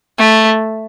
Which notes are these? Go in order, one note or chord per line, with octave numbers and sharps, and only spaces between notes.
A3